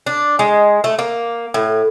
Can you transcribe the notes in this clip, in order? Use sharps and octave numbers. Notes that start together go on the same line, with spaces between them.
D4
G#3
A3
A#3
A2